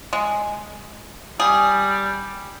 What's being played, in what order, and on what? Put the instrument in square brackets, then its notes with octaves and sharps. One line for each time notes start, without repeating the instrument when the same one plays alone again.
[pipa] G#3
[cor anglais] G3 [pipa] G#4